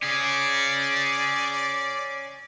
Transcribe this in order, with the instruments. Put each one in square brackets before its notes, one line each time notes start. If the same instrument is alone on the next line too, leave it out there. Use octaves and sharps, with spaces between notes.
[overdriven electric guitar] C#4 G#4 [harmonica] D5